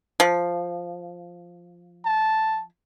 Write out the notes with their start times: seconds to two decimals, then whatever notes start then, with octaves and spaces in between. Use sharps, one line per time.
0.20 F3
2.05 A5